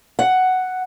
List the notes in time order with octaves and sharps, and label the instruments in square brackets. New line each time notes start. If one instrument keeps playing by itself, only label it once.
[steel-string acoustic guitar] F#5